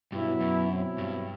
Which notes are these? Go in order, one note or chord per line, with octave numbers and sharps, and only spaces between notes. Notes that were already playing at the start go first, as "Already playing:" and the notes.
G2 B2 F#3 B3 E4
F#2
B2 F#3 C4 E4
G2